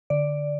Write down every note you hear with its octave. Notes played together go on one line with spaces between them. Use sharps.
D3 D5